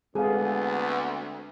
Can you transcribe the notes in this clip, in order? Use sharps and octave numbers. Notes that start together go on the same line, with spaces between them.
D2 G#3 B3 C4 G#4 A4 F5